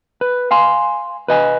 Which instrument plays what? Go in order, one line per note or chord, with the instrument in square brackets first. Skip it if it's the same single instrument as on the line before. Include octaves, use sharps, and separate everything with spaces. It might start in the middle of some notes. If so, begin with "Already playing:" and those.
[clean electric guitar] B4
F5 G#5 C6
B4 D#5 G#5